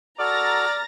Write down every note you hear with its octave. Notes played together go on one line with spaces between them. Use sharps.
F#4 A4 D5 A#5 F6 A6 A#6